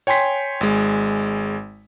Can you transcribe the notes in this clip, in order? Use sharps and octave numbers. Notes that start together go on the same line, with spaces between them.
C#5 G5 G#5 C6 B6
G#1 G#3